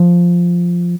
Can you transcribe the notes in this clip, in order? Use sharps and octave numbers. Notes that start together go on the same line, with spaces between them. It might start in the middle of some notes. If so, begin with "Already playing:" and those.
Already playing: F3